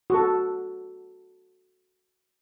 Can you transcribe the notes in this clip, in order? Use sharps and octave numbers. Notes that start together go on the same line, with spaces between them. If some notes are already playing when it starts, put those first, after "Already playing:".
F#4 A4